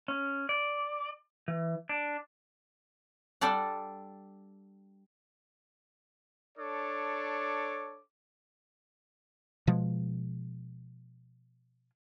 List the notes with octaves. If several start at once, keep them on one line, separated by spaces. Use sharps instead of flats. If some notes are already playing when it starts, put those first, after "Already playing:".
C#4
D5
E3
D4
G3 D4 A4 D5 F#5
D4 A4 C#5 D6
B2 F3 G#3